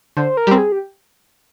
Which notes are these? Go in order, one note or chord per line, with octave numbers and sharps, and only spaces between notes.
D3 C5
A#4
G3 C4
G#4
G4